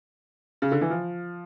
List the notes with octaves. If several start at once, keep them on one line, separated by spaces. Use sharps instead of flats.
C#3
D3
E3
F3